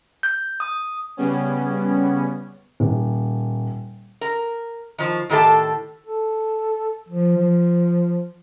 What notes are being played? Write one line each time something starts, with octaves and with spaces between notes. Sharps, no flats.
G6
D#6
C#3 G3 B3 C#4
D#1
A#4
D#3 F3
A2 D#3 G4 A4 A5
A4
F3
F3